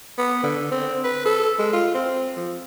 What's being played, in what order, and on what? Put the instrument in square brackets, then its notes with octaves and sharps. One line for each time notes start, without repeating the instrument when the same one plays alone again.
[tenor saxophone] B3
D3
C4
B4
A4
G#3
F4
C4
F3